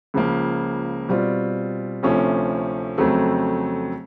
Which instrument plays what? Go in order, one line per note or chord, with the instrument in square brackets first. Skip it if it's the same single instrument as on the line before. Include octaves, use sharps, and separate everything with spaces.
[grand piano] C#2 C#3 F3 A#3
B2 G3 C4 F4
D2 C3 F3 A3 C#4
F2 C#3 F#3 A3 C4